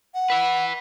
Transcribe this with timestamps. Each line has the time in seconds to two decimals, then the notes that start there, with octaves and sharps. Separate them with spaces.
0.14 F#5
0.30 B4 E5